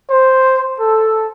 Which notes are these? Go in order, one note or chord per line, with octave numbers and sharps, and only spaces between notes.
C5
A4